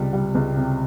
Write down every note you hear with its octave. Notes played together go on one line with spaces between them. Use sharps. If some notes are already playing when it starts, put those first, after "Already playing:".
Already playing: C#2 C3 G3
G3
C#2
C3